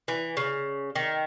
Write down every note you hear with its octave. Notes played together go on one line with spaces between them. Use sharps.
E3
C#3
D#3